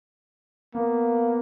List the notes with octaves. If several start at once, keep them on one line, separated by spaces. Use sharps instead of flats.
A#3 B3